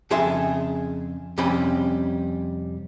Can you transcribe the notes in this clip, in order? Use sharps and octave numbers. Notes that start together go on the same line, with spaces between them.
F2 C#3 G#4 A4 E5 C6
F2 C3 G3 C#4 G5 B5